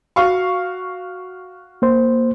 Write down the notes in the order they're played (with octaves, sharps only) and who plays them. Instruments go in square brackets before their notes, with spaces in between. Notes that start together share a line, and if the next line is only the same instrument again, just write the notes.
[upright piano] F#4 F5 C#6
[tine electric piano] A#3 C5